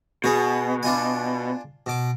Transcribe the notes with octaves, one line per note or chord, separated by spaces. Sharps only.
B2 F#4 G#4
D4 F4 G#5
B2 D6